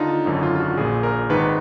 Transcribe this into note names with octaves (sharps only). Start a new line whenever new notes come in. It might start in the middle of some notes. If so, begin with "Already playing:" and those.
Already playing: D#2 D3 D4 D#4 F4
G#1 F#2 D3 D#4
F4
F4
F#4
A#1 A#2 G#4
A#4
G#1 G#2 D#3 B4